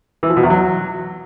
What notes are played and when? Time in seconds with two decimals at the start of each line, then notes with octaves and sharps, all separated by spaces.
0.23 E3
0.30 F3
0.37 B2
0.43 E2
0.50 F#3